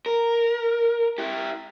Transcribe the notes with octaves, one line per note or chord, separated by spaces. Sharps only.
A#4
E4 G4